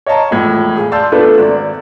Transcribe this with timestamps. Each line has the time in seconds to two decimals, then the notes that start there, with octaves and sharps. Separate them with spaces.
0.06 C#5 D#5 F5 A5 A#5
0.31 E1 F2 A2 G#6
0.77 G#4 F5
0.92 D5 F5 A5 C6 E6 G6
1.12 A3 B3 D4 F4 A4 B4
1.38 G#1 D5